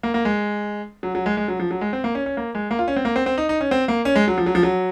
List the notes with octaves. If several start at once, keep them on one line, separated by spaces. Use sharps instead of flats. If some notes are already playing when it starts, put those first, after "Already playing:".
A#3
A#3
G#3
F#3
F#3
G#3
G#3
F#3
F3
F#3
G#3
C4
A#3
C#4
C#4
A#3
G#3
A#3
F4
C#4
C4
A#3
C4
C4
D#4
D#4
C#4
C4
A#3
C#4
G#3
F#3
F3
F#3
F3
F#3